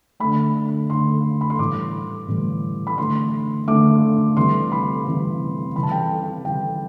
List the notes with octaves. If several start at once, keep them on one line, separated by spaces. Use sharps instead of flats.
D3 A3 B5
D3 A3 C6
B5
C6
A2 E3 G3 D6
A2 E3 G3
B5
D3 A3 C6
D3 A3 D6
C3 E3 G3 C6
B5
C3 E3 G3
C3 E3 G3 B5
A5
G5
A5
C3 E3 G3 G5